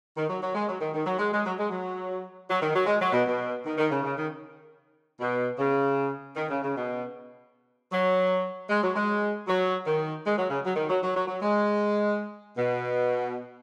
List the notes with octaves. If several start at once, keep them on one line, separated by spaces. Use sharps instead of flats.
D#3
F#3
F#3
G#3
F#3
D#3
D#3
F#3
G#3
G#3
F#3
G#3
F#3
F#3
D#3
F#3
G#3
F#3
B2
B2
D#3
D#3
C#3
C#3
D#3
B2
C#3
D#3
C#3
C#3
B2
F#3
G#3
F#3
G#3
F#3
D#3
G#3
F#3
C#3
F#3
D#3
F#3
F#3
F#3
F#3
G#3
B2